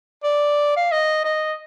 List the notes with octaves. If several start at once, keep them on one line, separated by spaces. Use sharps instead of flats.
D5
F5
D#5
D#5